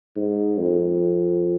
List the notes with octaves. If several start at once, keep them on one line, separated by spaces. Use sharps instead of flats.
G#2
F2